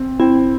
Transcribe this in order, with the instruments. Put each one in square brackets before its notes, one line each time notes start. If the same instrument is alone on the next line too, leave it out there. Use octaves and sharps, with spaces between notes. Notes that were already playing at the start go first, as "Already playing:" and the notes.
Already playing: [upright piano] C4
[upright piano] C4 [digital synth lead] E4